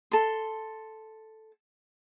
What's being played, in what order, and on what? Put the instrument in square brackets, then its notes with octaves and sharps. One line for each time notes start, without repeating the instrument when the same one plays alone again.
[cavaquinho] A4 C6